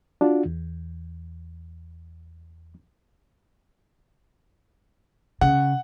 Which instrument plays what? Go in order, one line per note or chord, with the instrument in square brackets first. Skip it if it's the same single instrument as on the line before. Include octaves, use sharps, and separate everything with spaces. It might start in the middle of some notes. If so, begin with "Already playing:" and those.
[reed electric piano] D4 F4 F#4
E2
[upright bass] C#3 [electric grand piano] F#5